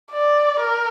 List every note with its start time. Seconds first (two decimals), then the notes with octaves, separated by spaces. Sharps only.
0.12 D5
0.60 A#4